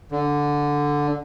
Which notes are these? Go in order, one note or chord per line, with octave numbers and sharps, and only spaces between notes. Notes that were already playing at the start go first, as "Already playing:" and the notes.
D3